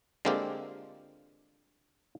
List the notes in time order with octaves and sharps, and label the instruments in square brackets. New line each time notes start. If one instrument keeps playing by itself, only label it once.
[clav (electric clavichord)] D3 G#3 A#3 C4 F4 G4